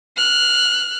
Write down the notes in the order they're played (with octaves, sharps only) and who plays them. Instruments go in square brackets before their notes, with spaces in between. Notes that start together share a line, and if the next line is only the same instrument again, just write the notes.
[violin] F6 F#6